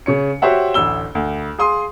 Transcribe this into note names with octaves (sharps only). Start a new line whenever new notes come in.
C#3 C#5 C#7
F#4 G4 C5 C#5 E5 F#5
A1 D2 E6 G7
D2
G#4 F5 C6 D#6